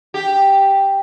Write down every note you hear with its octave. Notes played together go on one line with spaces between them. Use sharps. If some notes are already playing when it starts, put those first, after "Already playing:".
G4